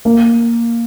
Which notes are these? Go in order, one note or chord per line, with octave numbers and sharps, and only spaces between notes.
A#3